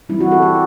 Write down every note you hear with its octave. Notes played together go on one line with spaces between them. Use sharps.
E3 G3 C4 E4
F#4
A4
G4